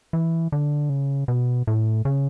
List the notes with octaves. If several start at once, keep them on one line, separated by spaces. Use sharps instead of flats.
E3
D3
C#3
B2
A2
C#3